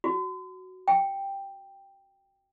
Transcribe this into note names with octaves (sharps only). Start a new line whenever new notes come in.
F#4
G5